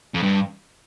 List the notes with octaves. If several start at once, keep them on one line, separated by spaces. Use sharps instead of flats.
F2
G2